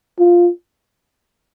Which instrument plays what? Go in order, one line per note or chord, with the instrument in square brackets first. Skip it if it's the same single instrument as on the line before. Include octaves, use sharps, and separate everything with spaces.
[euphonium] F4